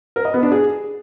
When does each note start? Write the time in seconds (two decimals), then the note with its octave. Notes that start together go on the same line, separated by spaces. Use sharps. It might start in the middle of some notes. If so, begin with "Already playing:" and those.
0.16 A#4
0.25 D#5
0.34 B3
0.43 D4
0.52 G#4